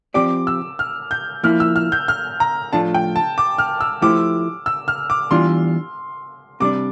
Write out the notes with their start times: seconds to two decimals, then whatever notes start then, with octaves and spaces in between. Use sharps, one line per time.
0.14 F3 C4 G4 D5 D6
0.47 E6
0.79 F6
1.11 G6
1.43 F3 A#3 E4 F6
1.60 E6
1.76 F6
1.92 G6
2.08 F6
2.40 A#5
2.73 A2 F3 A3 D4 F4 A5
2.94 G5
3.16 A5
3.38 D6
3.58 F6
3.81 E6
4.02 F3 A3 E4 G4 C5 D6
4.66 E6
4.88 F6
5.10 D6
5.31 E2 E3 G3 D4 F4 C6
6.60 C3 G3 D4 D6